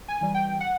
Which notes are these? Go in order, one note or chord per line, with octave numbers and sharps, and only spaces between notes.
G#5
E3 G3
G5
F#5